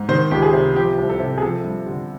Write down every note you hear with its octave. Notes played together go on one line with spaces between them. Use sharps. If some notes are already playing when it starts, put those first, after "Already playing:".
Already playing: G#2
D#3 C5
C#2 G4
G#4
C3
F3 G4
C2
A4
C3
G#4
F3 A4
G2
D3